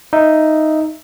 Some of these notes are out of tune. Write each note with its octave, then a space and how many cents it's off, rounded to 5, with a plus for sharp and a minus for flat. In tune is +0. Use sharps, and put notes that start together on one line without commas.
D#4 +0 E5 +5